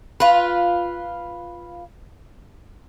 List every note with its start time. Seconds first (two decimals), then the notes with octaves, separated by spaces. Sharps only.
0.20 F4 B4